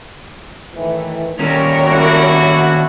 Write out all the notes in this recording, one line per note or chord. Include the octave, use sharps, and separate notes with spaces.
A2 D#3 E3 A3
D#2 G3 C#4 A#4 C#5
D4 E4 F#4